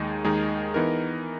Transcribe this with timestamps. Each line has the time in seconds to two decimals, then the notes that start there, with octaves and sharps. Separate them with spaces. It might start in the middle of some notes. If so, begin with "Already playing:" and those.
Already playing: D#2 D#3 G#3 D#4 G#4
0.24 D#2 D#3 G#3 D#4 G#4
0.74 E3 B3 D#4 A#4